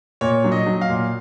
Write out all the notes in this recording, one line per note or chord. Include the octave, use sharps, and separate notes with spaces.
A#2 C#5
F#3
D#5
F#3
F5
A#2